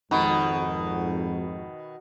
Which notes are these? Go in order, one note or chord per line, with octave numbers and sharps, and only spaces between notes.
G#1 F2 B2 D#3 D#4 F#4 B5